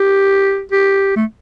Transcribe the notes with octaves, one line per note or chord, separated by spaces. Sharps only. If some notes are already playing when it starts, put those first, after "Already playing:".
Already playing: G4
G4
A3